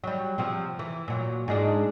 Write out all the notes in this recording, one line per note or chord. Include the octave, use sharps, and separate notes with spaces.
F#3 G3
C3 F3 C4
E3
A#2 F#3
G#2 G#3 D4